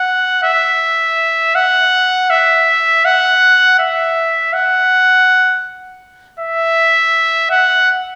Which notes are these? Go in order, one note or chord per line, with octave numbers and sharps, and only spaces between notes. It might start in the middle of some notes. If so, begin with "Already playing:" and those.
Already playing: F#5
E5
F#5
E5
F#5
E5
F#5
E5
F#5